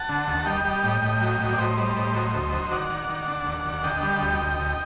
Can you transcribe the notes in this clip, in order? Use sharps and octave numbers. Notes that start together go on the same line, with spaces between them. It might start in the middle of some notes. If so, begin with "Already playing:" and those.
Already playing: F#5 A5
D3
D#2
G3 D#5 G5
G3
A2
A2
F#3
A2
D5
A2 C5 D#5
G3
A2
F#3
D2
F#3
D#3 D5 F#5
D#3
D#3
D3
D#2
D#2
D3 D#5 G5
G3
D2
D2
D2